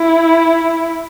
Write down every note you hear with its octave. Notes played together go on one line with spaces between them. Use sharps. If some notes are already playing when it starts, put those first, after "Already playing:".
Already playing: E4